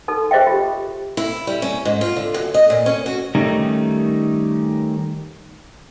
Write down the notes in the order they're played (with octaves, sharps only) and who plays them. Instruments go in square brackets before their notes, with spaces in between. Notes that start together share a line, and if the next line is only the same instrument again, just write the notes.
[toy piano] D#4 A4
G#4 C5 D#5 E5 G5
F4 G4
[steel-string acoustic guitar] E4
G3
C#4
G#2
F4
D3
F#2
D#5
A#2
C#4
F#4
[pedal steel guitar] D#3 G3 A3 C#4 D#4